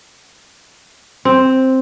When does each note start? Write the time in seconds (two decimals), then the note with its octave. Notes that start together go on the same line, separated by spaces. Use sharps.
1.25 C4